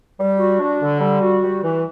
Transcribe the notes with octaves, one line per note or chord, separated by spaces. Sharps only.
G3
F#4
D4
D3
G3
F#4
G3
E3